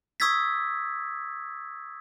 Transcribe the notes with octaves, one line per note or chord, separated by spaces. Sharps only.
C#6 D#6 E6 G#6 A6 B6